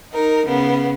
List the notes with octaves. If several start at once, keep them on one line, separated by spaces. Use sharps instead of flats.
D#4 A#4
C#3 B3